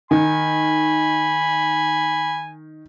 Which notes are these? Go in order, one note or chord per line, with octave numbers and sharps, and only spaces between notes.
D#3 G#5 B5